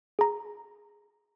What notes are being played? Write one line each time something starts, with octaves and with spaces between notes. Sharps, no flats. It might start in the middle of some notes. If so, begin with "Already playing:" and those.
G#4 A#5